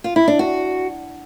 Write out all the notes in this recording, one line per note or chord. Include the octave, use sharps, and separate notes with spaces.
F4
E4
D4
F#4